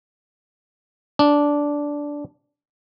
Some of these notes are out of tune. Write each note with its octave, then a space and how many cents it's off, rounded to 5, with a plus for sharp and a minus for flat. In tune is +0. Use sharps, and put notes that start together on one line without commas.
D4 -10